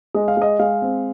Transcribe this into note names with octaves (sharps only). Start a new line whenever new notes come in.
G#3 D#5
F5
G#3 D#5
G#3 F5
C4